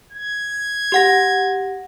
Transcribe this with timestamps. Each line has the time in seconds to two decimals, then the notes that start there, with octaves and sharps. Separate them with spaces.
0.12 G#6
0.92 G4 F#5 A#6